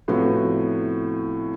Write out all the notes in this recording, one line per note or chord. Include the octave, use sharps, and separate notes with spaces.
A2 C3 F3 B3 F#4